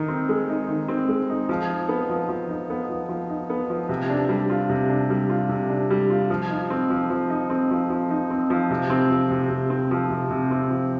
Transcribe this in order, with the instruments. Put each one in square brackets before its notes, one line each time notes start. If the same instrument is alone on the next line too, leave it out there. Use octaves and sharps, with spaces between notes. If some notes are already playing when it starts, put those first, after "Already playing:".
Already playing: [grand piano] D#3 D#4
C4
G#3
D#4
D#3
C4
G#3
D#4
F3
D#4
B3
F3
F3
D#4
B3
F3
F3
D#4
B3
F3
C3
D4
G3
F4
C3
D4
G3
F4
C3
D4
G3
F4
F3
D#4
C4
F3
F3
D#4
C4
F3
F3
D#4
C4
F3
C3
C4
F3
C3
C3
C4
F3
C3
C3
C4
F3